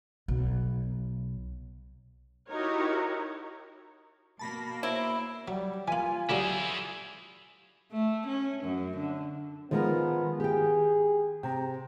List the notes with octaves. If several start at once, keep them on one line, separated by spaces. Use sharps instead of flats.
B1
D#4 E4 F#4 G4 A#4 C#5
B2 A#3 A5 B5 A#6
E4 C5 C#5 D7
F#3 G3
E3 A#3 F4 G#5
D2 F#3 G3 E4 G#4
A3
C#4
F#2
D3
D#3 F3 G#3 B3 A#4
G4 G#4 G5
C3 G5 A#5